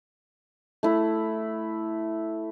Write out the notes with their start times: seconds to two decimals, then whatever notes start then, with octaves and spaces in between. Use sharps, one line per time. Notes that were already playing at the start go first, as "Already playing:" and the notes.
0.83 A3 E4